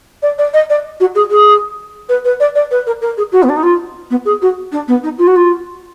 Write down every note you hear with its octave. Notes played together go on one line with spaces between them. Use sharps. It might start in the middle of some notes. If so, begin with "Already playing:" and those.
D5
D5
D#5
D5
F#4
G#4
G#4
B4
B4
D5
D5
B4
A#4
A#4
G#4
F#4
B3
D4
D#4
F4
B3
G#4
F#4
D4
B3
D#4
F4
F#4
F4